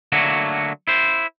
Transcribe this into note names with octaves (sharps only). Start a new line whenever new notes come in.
D3 F#3 A3 A#3 F#4
E4 C5